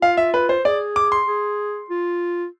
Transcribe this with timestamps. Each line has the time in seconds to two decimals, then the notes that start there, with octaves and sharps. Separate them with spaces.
0.02 F4 F5
0.17 E5
0.34 B4
0.49 C5
0.64 G#4 D5
0.96 D6
1.12 C6
1.27 G#4
1.90 F4